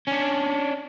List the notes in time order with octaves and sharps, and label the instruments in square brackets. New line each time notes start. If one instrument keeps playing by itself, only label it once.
[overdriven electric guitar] C#4 D4